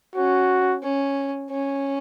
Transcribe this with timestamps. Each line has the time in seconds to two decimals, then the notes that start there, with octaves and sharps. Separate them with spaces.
0.15 C#4 F#4
0.83 C#4
1.51 C#4